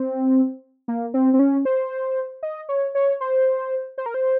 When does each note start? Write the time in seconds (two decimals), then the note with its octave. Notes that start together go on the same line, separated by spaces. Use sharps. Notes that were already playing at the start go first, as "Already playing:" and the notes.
Already playing: C4
0.88 A#3
1.14 C4
1.34 C4
1.39 C#4
1.65 C5
2.43 D#5
2.69 C#5
2.95 C#5
3.21 C5
3.98 C5
4.06 A#4
4.14 C5